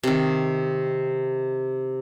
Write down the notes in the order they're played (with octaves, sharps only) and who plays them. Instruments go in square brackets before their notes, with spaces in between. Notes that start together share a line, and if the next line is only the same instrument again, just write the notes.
[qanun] C3 D#3